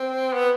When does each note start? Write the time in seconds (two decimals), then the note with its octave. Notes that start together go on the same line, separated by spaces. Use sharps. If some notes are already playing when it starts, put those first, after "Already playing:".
Already playing: C4
0.33 B3